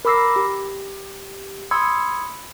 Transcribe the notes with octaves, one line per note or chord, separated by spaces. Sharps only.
A#4 B5 D6 E6 A#6 C7
G4
B5 C6 D#6 E6 G#6 C#7